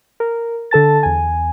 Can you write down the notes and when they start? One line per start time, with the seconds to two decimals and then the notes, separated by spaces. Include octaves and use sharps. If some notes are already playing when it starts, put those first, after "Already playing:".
0.20 A#4
0.71 D3 A4 A5 A6
1.03 E2 G#5